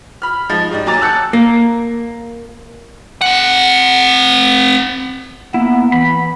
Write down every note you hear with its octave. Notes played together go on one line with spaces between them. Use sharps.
B5 F6
F3 G#3 D#4
G#2 G3 D#4
D#2 F#3 G#5 A#5 D6 A6
A5 E6 F#6 G6 C#7
A#3
C4 F#5
A#3 B3 E4
E3 B5